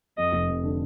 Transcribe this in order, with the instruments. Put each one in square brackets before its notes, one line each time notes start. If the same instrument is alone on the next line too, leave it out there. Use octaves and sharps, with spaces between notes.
[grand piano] F2 [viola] D#5
[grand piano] F1
F2
D3